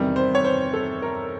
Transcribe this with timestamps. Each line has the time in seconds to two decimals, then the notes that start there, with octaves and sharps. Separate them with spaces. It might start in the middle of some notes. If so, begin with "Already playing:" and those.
Already playing: E2 C3 D#3 G3
0.16 C5
0.35 C#5
0.45 C5
0.73 A4
1.02 A#4